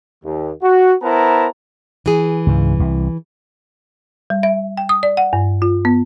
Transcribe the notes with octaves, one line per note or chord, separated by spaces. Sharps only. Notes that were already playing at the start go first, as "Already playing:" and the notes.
D#2
F#4
B3 E4 A#4 C5 A5 A#5
E3 G#4
C#2 G#2
C2
G3
E5
G5
D#6
D5
F#5
G2
F4
B3